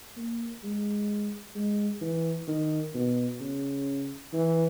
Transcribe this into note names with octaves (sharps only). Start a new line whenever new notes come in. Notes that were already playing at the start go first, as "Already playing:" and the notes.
A#3
G#3
G#3
E3
D#3
B2
C#3
E3